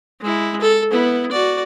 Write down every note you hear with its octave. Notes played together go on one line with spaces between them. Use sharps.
G#3 E4
A4
B3 E4
F#4 D5